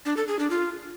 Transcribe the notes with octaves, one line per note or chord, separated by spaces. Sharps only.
D4
A4
G#4
D4
F4